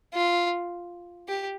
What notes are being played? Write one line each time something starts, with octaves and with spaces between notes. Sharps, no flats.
F4
G4